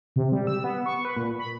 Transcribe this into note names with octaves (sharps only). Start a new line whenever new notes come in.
C3
G3
E6
B3
C#6
B4
A#2
B5